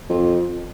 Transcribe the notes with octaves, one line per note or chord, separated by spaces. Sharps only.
F2